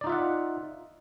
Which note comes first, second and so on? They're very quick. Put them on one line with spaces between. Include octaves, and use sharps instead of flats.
D5 D#4 F4 E5 F#5